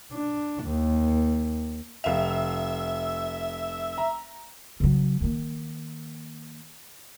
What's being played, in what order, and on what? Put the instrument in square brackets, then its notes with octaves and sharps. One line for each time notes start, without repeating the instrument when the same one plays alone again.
[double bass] D4
D#2
[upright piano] F1 F5 F7 [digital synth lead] E5
[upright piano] A#5
[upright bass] C#3 F#3
D#3 A#3